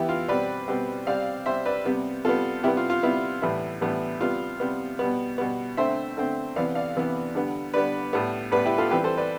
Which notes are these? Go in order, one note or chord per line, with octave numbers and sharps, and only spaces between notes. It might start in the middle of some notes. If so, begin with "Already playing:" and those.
Already playing: E3 B3 E4 G4
F4
B2 G3 C4 B4 D5
B2 G3 C4
C3 G3 C4 D5 F5
C3 G3 C4 C5 E5
B4 D5
C3 G3 B3
C3 G3 B3 F4 A4
C3 G3 B3 E4 G4
F4
F4
C3 G3 B3 E4
A2 E3 G3 B3 E4
A2 E3 G3 B3
C3 G3 B3 F4
C3 G3 B3
B2 G3 B3
B2 G3 B3
D3 A3 C4 C5 E5
D3 A3 C4
C3 E3 B3 D5 F5
D5 F5
C3 E3 B3
D3 G3 B3
D3 G3 B3 B4 D5
A2 G3 B3
A2 G3 B3 B4 D5
E4 G4
F4 A4
E3 G3 C4 G4 B4
A4 C5
B4 D5